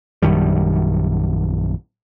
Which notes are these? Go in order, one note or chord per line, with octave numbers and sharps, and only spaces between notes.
A#1 F#2 D#3 G3